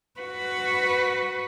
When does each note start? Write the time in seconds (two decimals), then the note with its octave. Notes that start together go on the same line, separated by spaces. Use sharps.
0.20 F#4 B4